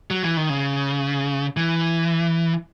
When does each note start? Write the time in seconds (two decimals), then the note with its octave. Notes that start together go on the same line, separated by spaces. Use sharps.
0.10 F#3
0.23 E3
0.37 D#3
0.49 C#3
1.57 E3